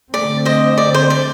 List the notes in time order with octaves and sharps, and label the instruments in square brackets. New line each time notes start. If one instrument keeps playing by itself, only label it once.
[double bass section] D3 A3 C4 [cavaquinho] D5
[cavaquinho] C5 D#5
D5
C5
D5